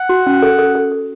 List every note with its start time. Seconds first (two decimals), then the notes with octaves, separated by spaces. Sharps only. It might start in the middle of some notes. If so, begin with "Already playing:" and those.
Already playing: F#5
0.09 F#4
0.27 C#4
0.43 A4
0.59 A4
0.75 A4
0.92 A4